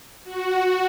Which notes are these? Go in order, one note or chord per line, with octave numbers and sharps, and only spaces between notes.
F#4